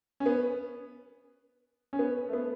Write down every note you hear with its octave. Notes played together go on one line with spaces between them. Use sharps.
C#4
B3
C#4
B3
A3
B3